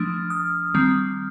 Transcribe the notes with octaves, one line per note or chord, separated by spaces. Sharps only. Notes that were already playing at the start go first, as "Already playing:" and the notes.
Already playing: F3 A3 D4 D#6 F6
D#6 F6
D#3 G3 C4